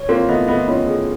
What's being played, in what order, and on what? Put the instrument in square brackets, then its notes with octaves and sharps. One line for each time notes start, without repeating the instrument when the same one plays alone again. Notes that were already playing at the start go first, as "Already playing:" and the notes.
Already playing: [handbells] C#5
[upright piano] A#3 C4 [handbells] F4
[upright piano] A3 B3 [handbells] D#5
[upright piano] A3 B3 [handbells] D#5
[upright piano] B3 C#4 [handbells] F4
[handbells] G#4